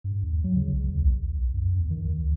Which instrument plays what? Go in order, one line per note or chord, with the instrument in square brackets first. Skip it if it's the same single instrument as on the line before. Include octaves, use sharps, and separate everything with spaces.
[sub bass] G2
D#2
F#3
C#3
C2
D#2
B1
F#2
E2
D#3
D2